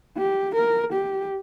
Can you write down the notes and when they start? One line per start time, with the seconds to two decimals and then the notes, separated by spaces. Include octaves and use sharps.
0.17 G4
0.55 A#4
0.92 G4